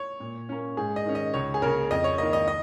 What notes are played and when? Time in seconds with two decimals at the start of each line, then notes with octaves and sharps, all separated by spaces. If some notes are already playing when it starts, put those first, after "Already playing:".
Already playing: C#5
0.20 A#2
0.49 A#3 C#4
0.77 G#2 G#4
0.96 D#5
1.06 D#3 C#4
1.15 D#5
1.34 C#2 C#5
1.54 G#4
1.62 C#3 A#3 C#4 A#4
1.91 F2 D#5
2.04 C#5
2.18 D#3 A#3 D#5
2.33 D#5
2.48 D#5